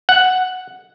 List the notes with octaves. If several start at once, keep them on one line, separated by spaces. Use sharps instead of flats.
F#5